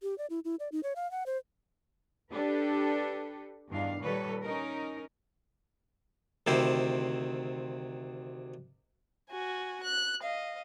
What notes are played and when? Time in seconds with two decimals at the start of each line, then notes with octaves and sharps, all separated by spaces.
0.03 G4
0.18 D5
0.30 E4
0.45 E4
0.60 D5
0.72 D#4
0.83 C#5
0.96 F5
1.11 F#5
1.26 C5
2.32 D4 G4 A4 B4
3.69 E2 G2 D#3 D4 F5
4.02 A#2 D#3 G3 A4 B4 C#5
4.43 C#4 D#4 A#4
6.47 D2 C3 D#3 E4 C5
9.30 F#4 G#5
9.83 F#6
10.22 D#5 F5